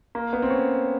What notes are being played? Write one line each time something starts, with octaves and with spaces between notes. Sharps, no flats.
A#3
B3
C4
C#4